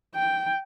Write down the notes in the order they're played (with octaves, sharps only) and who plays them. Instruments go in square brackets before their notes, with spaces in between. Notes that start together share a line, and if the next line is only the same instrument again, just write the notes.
[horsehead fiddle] G5